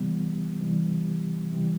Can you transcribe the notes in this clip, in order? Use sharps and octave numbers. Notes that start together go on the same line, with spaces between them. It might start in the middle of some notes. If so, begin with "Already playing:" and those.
Already playing: C3 E3 G3 B3
C3 E3 G3
C3 E3 G3